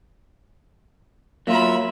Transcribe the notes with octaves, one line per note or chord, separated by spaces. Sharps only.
F#3 A#3 F4 E5 B5